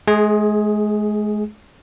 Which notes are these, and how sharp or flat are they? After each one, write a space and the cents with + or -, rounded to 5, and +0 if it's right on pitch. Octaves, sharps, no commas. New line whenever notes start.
G#3 +35 G#4 +0